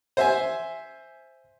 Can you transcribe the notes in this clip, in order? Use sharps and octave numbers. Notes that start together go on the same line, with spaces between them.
C5 E5 G#5